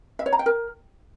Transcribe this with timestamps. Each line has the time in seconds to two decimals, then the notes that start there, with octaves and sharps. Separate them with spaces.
0.19 E5
0.26 C#5
0.33 A#5
0.39 G5
0.46 A#4